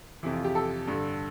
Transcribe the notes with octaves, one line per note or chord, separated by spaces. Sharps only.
F2 C3 E3 E4
F4
G4
A4
G2 D3